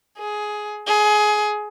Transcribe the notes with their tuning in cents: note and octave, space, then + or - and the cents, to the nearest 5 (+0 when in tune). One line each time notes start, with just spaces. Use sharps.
G#4 +15
G#4 +20